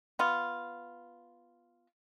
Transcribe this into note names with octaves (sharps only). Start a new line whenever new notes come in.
B3 F4